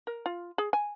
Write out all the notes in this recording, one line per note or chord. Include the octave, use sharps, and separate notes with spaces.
A#4
F4
G#4
G#5